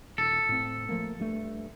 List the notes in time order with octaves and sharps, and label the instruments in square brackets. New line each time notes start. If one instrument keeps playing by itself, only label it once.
[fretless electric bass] D#1 [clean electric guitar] A4
[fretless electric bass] A2 C4
F3 A3 A#3
G2 A3